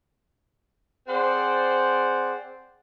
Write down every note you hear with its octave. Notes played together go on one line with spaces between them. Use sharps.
C4 G#4 C5 D5 F#5